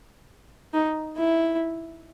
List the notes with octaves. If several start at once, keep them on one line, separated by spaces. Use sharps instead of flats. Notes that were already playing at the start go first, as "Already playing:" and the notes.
D#4
E4